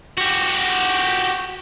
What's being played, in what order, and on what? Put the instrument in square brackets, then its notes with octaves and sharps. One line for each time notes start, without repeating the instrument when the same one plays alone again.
[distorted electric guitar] F#4 G4